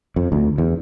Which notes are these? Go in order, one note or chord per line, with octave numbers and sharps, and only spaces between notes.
F2
D2
E2